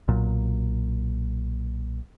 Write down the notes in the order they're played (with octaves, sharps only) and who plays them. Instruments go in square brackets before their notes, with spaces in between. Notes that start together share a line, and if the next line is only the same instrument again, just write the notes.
[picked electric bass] B1 A#2 F#3